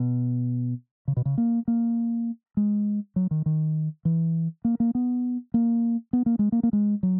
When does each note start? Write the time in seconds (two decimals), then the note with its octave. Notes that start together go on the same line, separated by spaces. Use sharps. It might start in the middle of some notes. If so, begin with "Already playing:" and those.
Already playing: B2
1.08 C#3
1.17 B2
1.25 C#3
1.38 A#3
1.68 A#3
2.57 G#3
3.16 F#3
3.31 D#3
3.46 D#3
4.05 E3
4.65 A#3
4.80 A#3
4.95 B3
5.54 A#3
6.13 B3
6.26 A#3
6.39 G#3
6.52 A#3
6.63 A#3
6.73 G#3
7.03 F#3